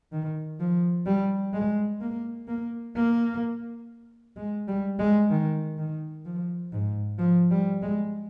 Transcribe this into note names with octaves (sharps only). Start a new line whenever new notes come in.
D#3
F3
G3
G#3
A#3
A#3
A#3
G#3
G3
G#3
D#3
D#3
F3
G#2
F3
G3
G#3